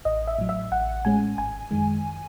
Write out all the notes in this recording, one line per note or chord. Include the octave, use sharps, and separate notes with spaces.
A1 D#5
E5
A2 F#3
E5
A1 F#5
A2 G#3 C#4 G#5
G#1 G#5
F#2 D#3 G#3